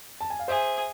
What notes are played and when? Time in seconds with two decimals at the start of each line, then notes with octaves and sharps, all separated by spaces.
0.21 A5
0.30 G#5
0.39 F5
0.48 G#4 C5 E5